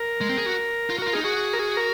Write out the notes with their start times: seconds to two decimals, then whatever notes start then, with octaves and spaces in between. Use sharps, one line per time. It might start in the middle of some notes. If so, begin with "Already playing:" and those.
Already playing: A#4
0.21 G#3
0.29 C4
0.38 G#4
0.47 F#4
0.90 F4
0.99 F#4
1.02 A#4
1.07 F4
1.13 G#4
1.16 D#4
1.24 F#4 G#4
1.53 A#4
1.59 G#4
1.77 A#4